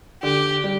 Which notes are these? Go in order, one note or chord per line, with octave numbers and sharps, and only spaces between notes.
D3 G4
G3